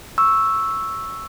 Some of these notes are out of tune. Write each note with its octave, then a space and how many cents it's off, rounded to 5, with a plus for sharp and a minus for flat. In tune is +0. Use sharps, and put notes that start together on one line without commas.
C#6 -5 E6 +0